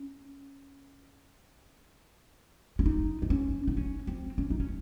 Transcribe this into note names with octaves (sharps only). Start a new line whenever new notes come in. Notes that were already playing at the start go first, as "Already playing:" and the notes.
Already playing: C#4
C#4
D#4
D#4
C#4
D#4
C#4
C4
C#4
D#4
C#4